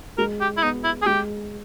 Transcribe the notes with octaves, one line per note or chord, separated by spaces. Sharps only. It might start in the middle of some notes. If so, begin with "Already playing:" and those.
G#3 A#4
G4
E4
B3 D#4
E4
G#4
G#3 G4